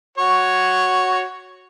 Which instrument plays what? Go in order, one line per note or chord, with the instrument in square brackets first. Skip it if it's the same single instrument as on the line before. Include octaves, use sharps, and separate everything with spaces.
[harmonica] F#4 C#5